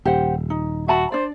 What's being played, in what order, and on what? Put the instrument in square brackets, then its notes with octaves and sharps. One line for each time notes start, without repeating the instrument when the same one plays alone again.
[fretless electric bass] D#1 [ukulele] G4 C5 F#5
[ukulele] D#4
[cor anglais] F#4 [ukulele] E5 A5 B5
[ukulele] D4 D5 [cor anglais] C5